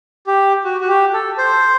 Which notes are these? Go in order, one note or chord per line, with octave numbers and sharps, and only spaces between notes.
G4
F#4
F#4
G4
A4
C5